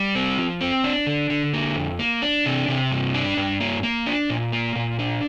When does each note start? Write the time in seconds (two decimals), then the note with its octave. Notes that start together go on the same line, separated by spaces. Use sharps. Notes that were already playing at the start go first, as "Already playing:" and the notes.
Already playing: G3
0.15 C4
0.38 F3
0.61 C4
0.84 D4
1.07 D3
1.30 D3
1.54 A#3
1.76 F2
1.99 A#3
2.22 D4
2.46 C3
2.68 C3
2.92 G2
3.14 D4
3.37 G2
3.60 A#3
3.83 A#3
4.06 D4
4.30 A#2
4.52 A#3
4.76 A#2
4.99 D4